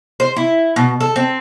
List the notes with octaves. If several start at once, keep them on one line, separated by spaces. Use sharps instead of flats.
C5
E4
B2
A4
C4